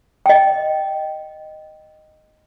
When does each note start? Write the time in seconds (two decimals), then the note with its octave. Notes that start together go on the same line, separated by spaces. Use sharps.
0.26 D#5 G5